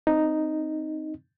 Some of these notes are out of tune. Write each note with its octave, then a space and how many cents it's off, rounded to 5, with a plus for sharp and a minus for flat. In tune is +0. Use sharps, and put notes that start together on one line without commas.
C4 +0 D#4 +0